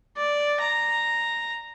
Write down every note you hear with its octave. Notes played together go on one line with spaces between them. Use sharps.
D5
A#5